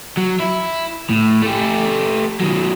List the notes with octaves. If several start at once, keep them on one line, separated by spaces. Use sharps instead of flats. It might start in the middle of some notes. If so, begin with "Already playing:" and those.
F#3
E4
A2
A3 G4
D#3 F#3